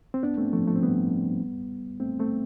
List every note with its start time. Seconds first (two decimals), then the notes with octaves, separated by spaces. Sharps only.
0.14 C4
0.23 B3 D4
0.38 A3 C4
0.53 F3 A3
0.67 F3 A3
0.75 C4
0.83 G3 B3
2.00 A3 C4
2.19 A3 C4